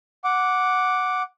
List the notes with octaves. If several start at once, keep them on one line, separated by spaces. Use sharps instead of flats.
F#5 D6